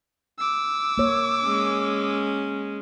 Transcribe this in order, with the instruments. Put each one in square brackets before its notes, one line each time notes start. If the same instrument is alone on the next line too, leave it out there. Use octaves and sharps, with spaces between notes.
[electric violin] D6 E6
[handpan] A#3 C#5
[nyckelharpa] G#3 C#4